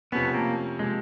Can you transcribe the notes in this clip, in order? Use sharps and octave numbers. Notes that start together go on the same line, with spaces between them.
F2 C3 F3 A3 B3 C#4
A#3
C3 F3 G#3 A#3